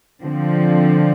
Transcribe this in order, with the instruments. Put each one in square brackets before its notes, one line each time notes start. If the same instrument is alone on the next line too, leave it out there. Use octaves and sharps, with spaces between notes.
[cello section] D3 F3 C4